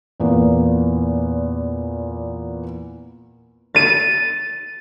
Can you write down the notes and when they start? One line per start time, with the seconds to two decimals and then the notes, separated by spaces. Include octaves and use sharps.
0.20 E2 A#2 A#3 B3
3.75 A6 D#7